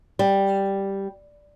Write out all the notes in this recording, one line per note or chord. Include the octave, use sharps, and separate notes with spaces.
G3